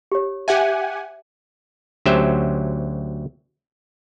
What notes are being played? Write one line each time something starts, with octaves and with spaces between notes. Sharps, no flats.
G4 C#5
G4 E5 F#5 G#5
D2 F#3 C#4 G4 C5 E5